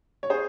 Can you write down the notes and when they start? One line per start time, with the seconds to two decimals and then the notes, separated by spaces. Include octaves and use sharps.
0.23 C#5
0.30 G#4 C5